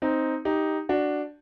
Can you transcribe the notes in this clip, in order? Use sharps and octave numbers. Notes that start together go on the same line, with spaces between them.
C4 D#4
D#4 G4
D4 F#4